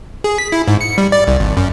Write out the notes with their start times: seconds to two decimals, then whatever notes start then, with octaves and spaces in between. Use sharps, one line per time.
0.24 G#4
0.38 B6
0.52 E4
0.68 G#2
0.81 C#7
0.98 G3
1.12 D5
1.27 C2
1.40 G#1
1.57 F#2